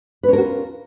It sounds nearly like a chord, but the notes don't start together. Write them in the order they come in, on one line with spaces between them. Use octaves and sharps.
B4 C#4 A#4 F#4 F4